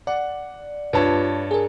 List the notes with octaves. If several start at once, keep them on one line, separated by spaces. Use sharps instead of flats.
D5 F#5
G2 F4 B4 C#5 A5
G#4 A#4